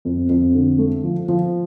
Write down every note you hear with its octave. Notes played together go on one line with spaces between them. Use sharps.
F2
F2
D3
A3
F3
F3